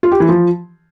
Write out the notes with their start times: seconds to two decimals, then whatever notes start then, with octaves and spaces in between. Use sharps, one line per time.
0.03 F4
0.12 G4
0.20 E3
0.29 F3